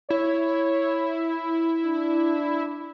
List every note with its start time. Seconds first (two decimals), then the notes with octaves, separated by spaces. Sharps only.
0.10 E4 C#5
1.84 D4